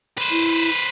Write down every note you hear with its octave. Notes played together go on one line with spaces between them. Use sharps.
B4 C5
E4